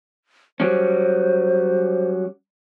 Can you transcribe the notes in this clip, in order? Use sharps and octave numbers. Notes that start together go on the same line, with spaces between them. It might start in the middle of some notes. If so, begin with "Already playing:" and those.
F#3 G3 C#4 C5